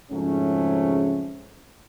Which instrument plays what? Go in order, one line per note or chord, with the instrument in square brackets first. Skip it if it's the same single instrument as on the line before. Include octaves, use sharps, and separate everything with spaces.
[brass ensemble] F2 G#2 C#3 F#3 A3 C#4